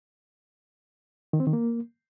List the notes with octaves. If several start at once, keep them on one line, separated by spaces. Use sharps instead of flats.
D#3
C4
D#3
A#3